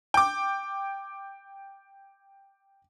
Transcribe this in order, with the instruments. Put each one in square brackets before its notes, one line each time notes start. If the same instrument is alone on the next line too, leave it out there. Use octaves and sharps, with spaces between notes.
[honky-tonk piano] G5 D6